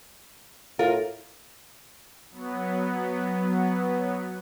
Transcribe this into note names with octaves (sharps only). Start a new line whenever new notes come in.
A2 F4 A#4
F#3 B3